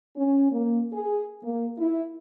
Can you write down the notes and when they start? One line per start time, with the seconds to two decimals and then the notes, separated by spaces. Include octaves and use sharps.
0.16 C#4
0.52 A#3
0.92 G#4
1.43 A#3
1.79 E4